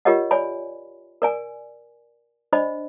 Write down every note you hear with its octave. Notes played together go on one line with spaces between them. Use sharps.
F4 G4 A#4 C#5 D#5 F#5
C#5 D5 G#5 B5
A#4 D5 G#5
D4 C5 D5 D#5 B5